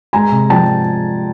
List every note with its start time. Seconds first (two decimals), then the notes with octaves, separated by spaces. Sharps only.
0.13 G#3 G#5 A#5
0.32 C3
0.50 F3 G5 A5